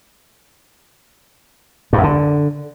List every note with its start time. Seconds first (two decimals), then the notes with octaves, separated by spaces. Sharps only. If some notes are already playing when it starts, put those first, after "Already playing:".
1.93 G2
1.98 F#2
2.03 D3